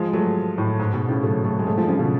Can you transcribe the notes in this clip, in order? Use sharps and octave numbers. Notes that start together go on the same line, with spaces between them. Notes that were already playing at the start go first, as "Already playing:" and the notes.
Already playing: F3 G#3
F#3 A3
A2
G#2
G#2 B2
A2 C#3
F#3 A3
F#3 A3
G#3
F#3 A3
F3 G#3
C#3 F3
B2 D3